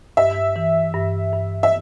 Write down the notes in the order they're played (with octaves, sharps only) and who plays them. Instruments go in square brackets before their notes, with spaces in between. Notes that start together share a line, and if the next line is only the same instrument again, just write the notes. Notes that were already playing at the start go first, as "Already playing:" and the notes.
[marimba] G2 [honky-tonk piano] E5
[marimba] E3
G2
G2
[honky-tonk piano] E5